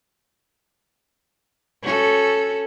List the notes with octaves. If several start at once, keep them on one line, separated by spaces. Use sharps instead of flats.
C#4 F#4 A4